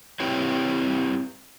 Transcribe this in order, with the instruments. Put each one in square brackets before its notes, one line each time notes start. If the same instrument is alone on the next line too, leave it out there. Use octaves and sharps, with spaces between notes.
[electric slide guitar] C4 E4 G4 B4 C#5